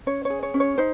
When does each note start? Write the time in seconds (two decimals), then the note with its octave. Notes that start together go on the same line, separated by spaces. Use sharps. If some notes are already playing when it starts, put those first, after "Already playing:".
0.06 C#4 C#5
0.25 C#5
0.30 G#4
0.43 C#5
0.54 C#4
0.60 C#5
0.78 D#4 C5